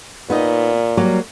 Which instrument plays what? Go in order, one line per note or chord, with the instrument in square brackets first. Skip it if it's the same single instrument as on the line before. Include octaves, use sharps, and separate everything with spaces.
[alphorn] A#2 [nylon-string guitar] B3 D#4 D#5
[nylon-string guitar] F#3 G3 A#3